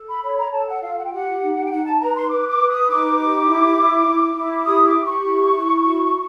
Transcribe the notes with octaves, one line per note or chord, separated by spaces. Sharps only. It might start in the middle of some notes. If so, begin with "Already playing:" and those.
Already playing: A4
B5
C#5 B5
A#5
A4 A5
F#5
F4 F5
F#5
G5
G4 F#5
D#4
G5
D#4 F#5
A5
B4 A#5
C6
B4 D6
D6
B4
D#6
D#4 D6
G4
E4
E4
E4
E4
G4 D#6
D6
G4
C#6
E4
E4
F#4